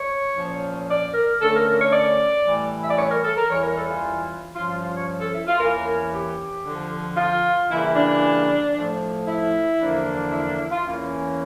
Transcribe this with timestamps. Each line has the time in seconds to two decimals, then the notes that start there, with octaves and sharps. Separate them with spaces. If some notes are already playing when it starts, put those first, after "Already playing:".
Already playing: C#5
0.35 A#2 F3 C#4
0.88 D5
1.14 A#4
1.40 D3 A3 C#4 A4
1.53 A#4
1.66 A#4
1.80 C#5
1.92 D5
2.45 A2 E3 G3
2.82 E5
2.90 D5
2.98 C#5
3.10 A#4
3.24 A4
3.37 A#4
3.50 E2 E3 G3 C#4 C#5
3.63 A#4
3.76 A4
3.89 F4
4.55 G2 F3 C#4 F4
4.68 F4
4.81 F4
4.94 C#5
5.20 A4
5.33 E4
5.47 F4
5.59 E2 E3 A#3 C#4 A#4
6.12 G4
6.65 F2 D3 F3
7.17 F4
7.69 C#3 E3 G3 A#3 E4
7.96 D4
8.74 A2 F3 A3
9.27 E4
9.80 E2 D3 F3 A#3 D4
10.32 E4
10.58 E4
10.71 F4
10.84 E2 E3 A#3 C#4